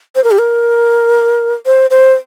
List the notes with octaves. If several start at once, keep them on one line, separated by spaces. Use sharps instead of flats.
C5
A#4
G4
A#4
C5
C5